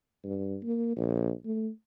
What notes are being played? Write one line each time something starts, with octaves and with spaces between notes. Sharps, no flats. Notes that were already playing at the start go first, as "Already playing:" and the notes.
G2
A#3
A#1
A3